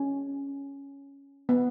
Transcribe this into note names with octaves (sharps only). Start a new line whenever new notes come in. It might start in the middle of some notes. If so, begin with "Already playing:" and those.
Already playing: C#4
B3